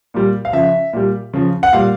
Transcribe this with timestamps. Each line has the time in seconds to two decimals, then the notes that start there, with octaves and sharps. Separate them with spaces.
0.14 A#2 G3
0.45 F5
0.53 C#3 F3 E5
0.93 A#2 G3
1.34 C#3 F3
1.63 F#5
1.73 A#2 G3 F5